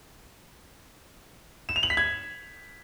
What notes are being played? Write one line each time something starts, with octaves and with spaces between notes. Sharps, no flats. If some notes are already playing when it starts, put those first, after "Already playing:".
E7
F7
F#7
B6
G#6